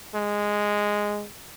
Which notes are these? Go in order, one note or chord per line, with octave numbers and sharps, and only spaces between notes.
G#3